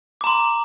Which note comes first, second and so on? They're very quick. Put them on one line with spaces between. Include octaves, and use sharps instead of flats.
D6 A#5 C6